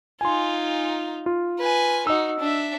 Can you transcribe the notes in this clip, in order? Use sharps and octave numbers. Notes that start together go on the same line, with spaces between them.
D#4 F4 G#5 C6
F4
B4 G#5
D#4 F#4 D#5 E6
D4 E5